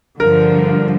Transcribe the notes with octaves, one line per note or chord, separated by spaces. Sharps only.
G2 D3 F3 A#4